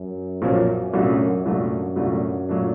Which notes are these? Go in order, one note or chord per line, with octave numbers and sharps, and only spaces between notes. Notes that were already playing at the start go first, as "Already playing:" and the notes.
Already playing: F#2
B1 A#2 F3 A#3 C#4
C2 F#2 A#2 F#3 A3 D4
C2 F#2 A#2 F#3 A3 D4
C2 A#2 F#3 A3 D4
A#2 F#3 A3 D4